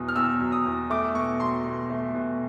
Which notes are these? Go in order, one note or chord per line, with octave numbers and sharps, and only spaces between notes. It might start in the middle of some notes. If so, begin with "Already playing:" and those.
Already playing: E2 B2 F#3 D#6
F6
E2 E6
F#3
D#6
E2
A3 D6
B2 C#6
F#3 C6
B2
A3
B2